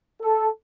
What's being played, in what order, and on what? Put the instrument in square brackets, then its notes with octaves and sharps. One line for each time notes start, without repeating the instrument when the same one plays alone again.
[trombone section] A4